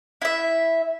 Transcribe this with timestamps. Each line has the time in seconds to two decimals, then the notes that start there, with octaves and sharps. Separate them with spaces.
0.22 E4 E5